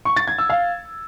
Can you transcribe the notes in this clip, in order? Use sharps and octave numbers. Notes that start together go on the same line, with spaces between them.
C#6
A6
G#6
E6
F5